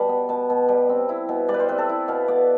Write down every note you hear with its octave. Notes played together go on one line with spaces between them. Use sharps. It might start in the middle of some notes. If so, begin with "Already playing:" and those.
Already playing: B2 G3 A5 B5
B3
B2 A5
B2
G3
C4
E4
B2
G3 D5
B4
C5
C4 B4
A4
E4
B2 F5
B3 D5